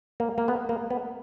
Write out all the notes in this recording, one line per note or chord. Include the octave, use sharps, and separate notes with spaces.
A#3
A#3
B3
A#3
B3